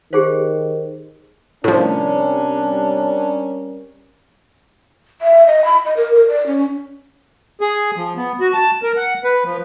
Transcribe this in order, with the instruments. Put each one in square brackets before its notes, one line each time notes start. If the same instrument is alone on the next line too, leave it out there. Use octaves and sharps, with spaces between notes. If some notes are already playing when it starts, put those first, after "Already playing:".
[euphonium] D#3 [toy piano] G4 G#4 C5
[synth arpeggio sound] A2 F3 [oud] C3 [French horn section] G3 C#4 A#4 [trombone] D4
[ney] E5
D#5
B5
D#5
A#4
A#4
D5
C#4
[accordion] G#4
F3
B3
F#4
A5
A#4
F#5
B4
F3